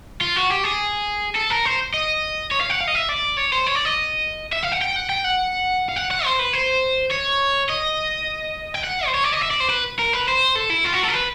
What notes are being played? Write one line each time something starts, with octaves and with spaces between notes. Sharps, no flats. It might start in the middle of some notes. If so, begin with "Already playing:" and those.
F4
F#4
G4
G#4
A4
A#4
C5
D#5
C#5
F5
F#5
F5
D#5
E5
D5
C#5
C5
C#5
D5
D#5
E5
F5
F#5
G5
F#5
G5
F#5
F5
F#5
F#5
C5
B4
C5
C#5
D#5
G5
F#5
C5
C#5
D5
D#5
E5
D5
C5
B4
A#4
B4
C5
A4
E4
F4
F#4
A4
A#4
B4